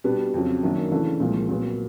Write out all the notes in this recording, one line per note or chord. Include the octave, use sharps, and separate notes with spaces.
B2 G3 B3 D4
F2 C#3 F#3
F#2 D#3 F#3 A#3 D4
C#3 E3 A3 D4
C2 A#2 F3 G#3
A#2 F#3 B3